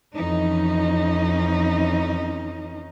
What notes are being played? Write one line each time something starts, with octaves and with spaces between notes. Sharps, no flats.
F2 E3 C#4 D#4